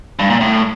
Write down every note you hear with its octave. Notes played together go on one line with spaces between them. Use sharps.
G2
A#2
A2